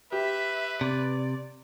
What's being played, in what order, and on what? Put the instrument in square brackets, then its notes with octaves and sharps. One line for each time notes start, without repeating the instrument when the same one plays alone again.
[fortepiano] G4 [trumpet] B4 [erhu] E5
[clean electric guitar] C3 [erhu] D5